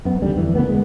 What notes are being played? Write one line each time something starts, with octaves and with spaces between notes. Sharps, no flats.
F#2 B3
D#2 D3 G3
F2 E3
C#3 E3 A#3 B3
G#3 B3